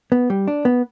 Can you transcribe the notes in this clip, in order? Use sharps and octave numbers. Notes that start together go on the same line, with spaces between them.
B3
G3
D4
B3